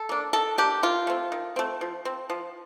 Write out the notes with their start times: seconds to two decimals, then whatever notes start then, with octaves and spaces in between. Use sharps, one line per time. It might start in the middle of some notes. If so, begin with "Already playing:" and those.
Already playing: A4
0.09 A#3 D4
0.33 D#3 A4
0.58 A#3 D4 G4
0.83 D#3 F4
1.07 A3 C4
1.32 D#3
1.56 A3 C4
1.81 F3
2.05 C4
2.30 F3